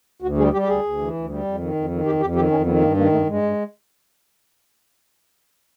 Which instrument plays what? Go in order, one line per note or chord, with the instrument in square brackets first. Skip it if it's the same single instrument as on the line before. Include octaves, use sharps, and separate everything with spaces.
[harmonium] D2 F#4
G3 G#4
G3 G4
G4
D2 G#4
D2
E3
D2
G3
F2
D#3
F2
D#3
F2 G4
F2 G4
D#3 G4
F2 C#4
D#3 B3
G2 A#3
D#3 A#3
G2 A3
G2 G#3
G2